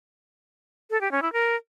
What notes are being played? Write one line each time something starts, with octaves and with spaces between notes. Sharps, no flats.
A4
G4
C#4
E4
A#4